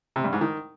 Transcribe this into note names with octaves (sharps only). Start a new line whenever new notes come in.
C3
G2
G#2
D#3